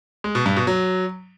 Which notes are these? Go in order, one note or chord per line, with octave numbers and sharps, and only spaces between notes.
G#3
B2
G2
B2
F#3